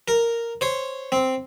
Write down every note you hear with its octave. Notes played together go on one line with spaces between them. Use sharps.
A#4
C5 C#5
C4